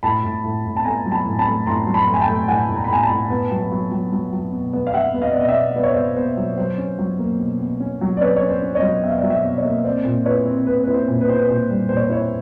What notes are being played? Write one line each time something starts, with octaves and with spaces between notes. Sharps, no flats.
A2 A5 B5
A2
A2
A2
A5
A3 G#5 A#5
F#3
A5 B5
A2
A5 B5
A3
A2 A#5 C6
F#3
A5 B5
A3
G#5
G5 A5
A3
A2 F#5 G#5
A2
A#5
B5
A2 G#5 A#5
A5 B5
A2
B3
F#3
F#3
F#3
F#3
F#3
B2
B3
F5
B3 E5 F#5
B3
D#5 F5
B2 D5
D#5
D5 E5
B2
B3 D5
C#5
B3 C5 D5
B2 C5
F#3
F#3 C5
C#4
F#3
A#3
B2
B2
C#4
F#3
D5
C#4 B4 C#5
C#5
C#4
C5 D5
C#4
C#5 D#5
F#3
B2 E5
F5
D5 E5
F#3
D5 E5
B2
C#5 D#5
A#3
C4 C5 D5
A#2
E4 B4 C#5
C4
C4 B4
E4 B4
C5
A#2
B4
E4 C5
B4
A#2 C5
G3
A#2 C5
C#5
C5
E4 C#5
C5